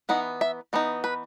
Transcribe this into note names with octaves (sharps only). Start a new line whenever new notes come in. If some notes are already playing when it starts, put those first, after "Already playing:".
E3 B3 D#4 F#5
E5
E3 B3 D#4
B4